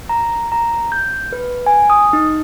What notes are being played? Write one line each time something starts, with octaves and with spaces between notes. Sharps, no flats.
A#5
A#5
G6
B4
G#5
D#6
D#4